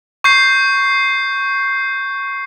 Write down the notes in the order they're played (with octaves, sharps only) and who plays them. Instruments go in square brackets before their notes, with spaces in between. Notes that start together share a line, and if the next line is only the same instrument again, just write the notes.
[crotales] C#6 G6 C7